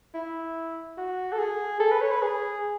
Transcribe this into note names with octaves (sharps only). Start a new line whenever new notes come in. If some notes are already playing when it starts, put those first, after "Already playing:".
E4
F#4
A4
G#4
A4
B4
C#5
B4
G#4